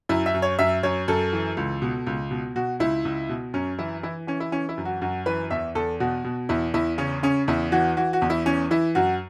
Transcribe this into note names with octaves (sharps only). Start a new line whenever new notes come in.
F#2 E4
E5
F#2
C#5
F#2 E5
F#2 C#5
F#2 A4
E3
C#2
B2
C#2
B2
B2 F#4
C#2 E4
C#2
B2
F#2 C#4
E3 E4
E3 E4
E3 C#4
E4
E3 C#4
E4
F#2
F#4
F#2 F#4
E3 B4
E2 E5
E2 A4
B2 F#4
B2
E2 E4
E2 E4
C#3 C#4
C#3 C#4
E2 E4
E3 F#4
E3 F#4
F#4
E2
E4
E3 C#4
E3 E4
F#2 F#4